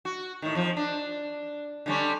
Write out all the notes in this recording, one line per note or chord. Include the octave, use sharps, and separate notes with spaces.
F#4
A2 D#3
F2 F3
D4
D3 G3 C#4